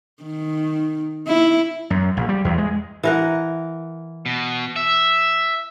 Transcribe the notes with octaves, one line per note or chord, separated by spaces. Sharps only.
D#3
E4
F#2
A#1
G3
E2
G#3
E3 A#4 F#5
B2
E5